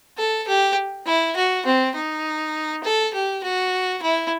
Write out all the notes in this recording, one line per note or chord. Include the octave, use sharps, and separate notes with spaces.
A4
G4
E4
F#4
C4
D#4
A4
G4
F#4
E4